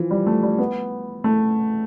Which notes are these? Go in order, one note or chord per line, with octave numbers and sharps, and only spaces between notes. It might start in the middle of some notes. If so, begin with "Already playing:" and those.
Already playing: E3 F3
G3
A3
G3
B3
A3